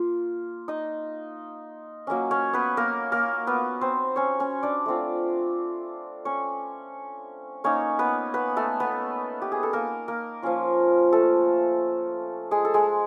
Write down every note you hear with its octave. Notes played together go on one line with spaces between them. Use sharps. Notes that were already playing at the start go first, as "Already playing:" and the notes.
Already playing: A#3 F4
D#4 D#5
F#3 A#3 C#4
C#4 C#5
B3 B4
A#3 A#4
A#3 A#4
B3 B4
C4 C5
C#4 C#5
C#4 C#5
D4 D5
A3 C4 F4
C#4 C#5
A#3 C#4 D#4 C#5
B3 B4
B3 B4
A3 A4
B3 B4
G4
G#4
A4
A#3 A#4
A#3 A#4
F3 A#3 C#4 F4
A3 A4
G#3 G#4
A4
G#3 G#4